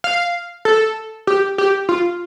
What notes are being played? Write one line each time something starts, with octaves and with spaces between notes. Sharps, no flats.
F5
A4
G4
G4
F4